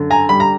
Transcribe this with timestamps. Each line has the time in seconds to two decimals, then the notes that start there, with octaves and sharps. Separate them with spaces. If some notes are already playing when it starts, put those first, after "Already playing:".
Already playing: F#2 D3
0.10 G#5 A#5
0.29 G3 B5
0.40 A#5